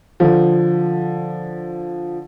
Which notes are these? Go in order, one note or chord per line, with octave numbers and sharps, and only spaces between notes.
D3 F3